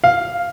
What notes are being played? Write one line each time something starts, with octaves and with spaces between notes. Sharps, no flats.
F5